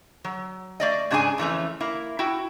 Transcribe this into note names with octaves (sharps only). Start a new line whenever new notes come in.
F#3
A3 D5 D#5
G#2 C#3 D4 G4 G#4 G#5
F2 E3 A3 C#4
A#3 E4
E4 F#4 G5